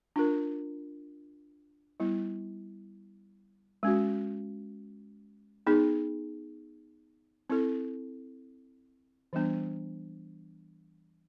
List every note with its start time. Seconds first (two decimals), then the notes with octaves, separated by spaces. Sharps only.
0.16 D4 F4 A#4
2.00 G3 B3 E4
3.83 G#3 C#4 F#4
5.67 B3 D#4 G#4
7.50 C4 E4 A4
9.33 E3 G3 B3 D4